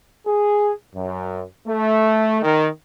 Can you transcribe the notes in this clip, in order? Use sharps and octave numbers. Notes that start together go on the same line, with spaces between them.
G#4
F#2
A3
D#3